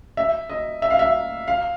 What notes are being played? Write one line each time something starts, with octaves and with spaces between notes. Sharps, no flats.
E5
D#5
E5
F5
E5
F5